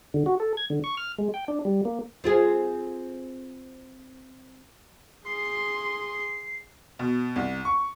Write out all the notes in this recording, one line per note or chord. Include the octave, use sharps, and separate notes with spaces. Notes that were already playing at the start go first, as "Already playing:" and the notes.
D3
F#4
A4
G#6
D3
C#6
F6
G#3
G5
D4
G3
A#3
C4 F4 G#4
G#4 C6 C7
B2
C2
C#6